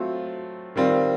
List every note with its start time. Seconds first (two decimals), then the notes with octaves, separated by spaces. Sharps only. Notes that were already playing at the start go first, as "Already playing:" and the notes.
Already playing: F#3 A3 C4 F4
0.76 D#3 G3 C4 F4